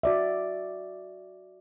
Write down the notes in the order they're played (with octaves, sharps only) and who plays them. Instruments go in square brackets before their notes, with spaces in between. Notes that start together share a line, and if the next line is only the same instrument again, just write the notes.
[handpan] F#4 D5 E5